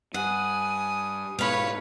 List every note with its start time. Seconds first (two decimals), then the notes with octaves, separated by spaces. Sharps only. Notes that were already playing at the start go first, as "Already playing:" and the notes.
0.14 G2 F#5 G#5 D#6
1.39 G#2 B2 G#3 B4 C#5 F5 B5